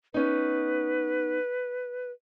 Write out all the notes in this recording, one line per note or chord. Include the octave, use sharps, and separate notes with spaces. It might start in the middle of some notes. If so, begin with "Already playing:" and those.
B3 C#4 D#4 B4